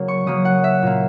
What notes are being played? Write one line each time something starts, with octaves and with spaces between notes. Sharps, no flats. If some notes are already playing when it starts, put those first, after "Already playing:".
Already playing: C#3 F#3 A#3
C#6
C#3 F#3 A#3 D#6
F#5
E5
A#2 A#3